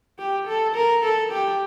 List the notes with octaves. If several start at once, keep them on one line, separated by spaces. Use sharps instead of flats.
G4
A4
A#4
A4
G4